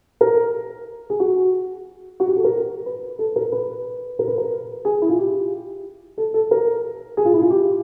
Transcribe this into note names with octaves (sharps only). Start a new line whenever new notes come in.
A#4
G#4
F#4
F#4
G4
A4
A#4
B4
A4
A#4
B4
A#4
B4
A#4
G#4
E4
F4
G4
A4
A4
A#4
G#4
F4
E4
F4
G4